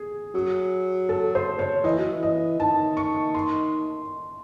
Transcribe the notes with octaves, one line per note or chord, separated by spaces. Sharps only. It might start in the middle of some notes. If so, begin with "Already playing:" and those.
Already playing: G#4
F#3
A4
C5
C#5
E3 D#5
F#3
E3
D#5
D#3 A5
C#6
C6